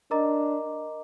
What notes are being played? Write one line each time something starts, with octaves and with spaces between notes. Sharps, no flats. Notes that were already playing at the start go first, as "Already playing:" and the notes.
D4 A#4 D#5 A#5 D6